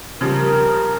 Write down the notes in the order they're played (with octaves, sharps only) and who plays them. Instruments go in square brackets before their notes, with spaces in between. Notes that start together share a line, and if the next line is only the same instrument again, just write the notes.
[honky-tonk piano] C#3 F3 G3 [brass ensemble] A#4